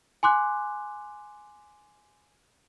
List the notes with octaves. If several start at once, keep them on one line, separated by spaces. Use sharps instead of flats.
G#5 C6 D6 F#6